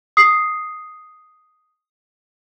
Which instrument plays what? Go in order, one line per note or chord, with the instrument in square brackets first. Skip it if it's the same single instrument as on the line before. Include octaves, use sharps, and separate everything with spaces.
[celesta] D#6 C7